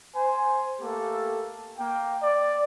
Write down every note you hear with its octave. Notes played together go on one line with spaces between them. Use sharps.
C5 G#5
A3 A#3 G4 A4
A#3 G5
D5